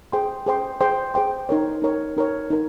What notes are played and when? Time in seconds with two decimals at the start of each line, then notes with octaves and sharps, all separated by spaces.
0.12 G#4 C5 G5 C6
0.46 G#4 C5 G5 C6
0.81 G#4 C5 G5 C6
1.14 G#4 C5 G5 C6
1.49 D#4 A#4 C#5
1.82 D#4 A#4 C#5
2.17 D#4 A#4 C#5
2.50 D#4 A#4